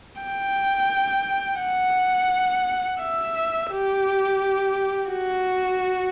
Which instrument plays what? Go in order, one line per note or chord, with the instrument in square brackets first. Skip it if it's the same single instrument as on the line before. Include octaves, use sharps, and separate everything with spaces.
[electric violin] G5
F#5
E5
G4
F#4